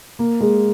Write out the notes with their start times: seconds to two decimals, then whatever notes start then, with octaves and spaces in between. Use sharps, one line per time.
0.19 A#3
0.41 G#3